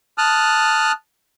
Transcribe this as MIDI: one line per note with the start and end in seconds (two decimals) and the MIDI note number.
0.18 0.92 81
0.18 0.92 87
0.18 0.92 89
0.18 0.92 90